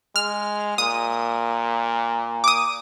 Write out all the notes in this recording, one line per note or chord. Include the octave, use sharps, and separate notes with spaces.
G#3 F6
A#2 D#6
D6 D#6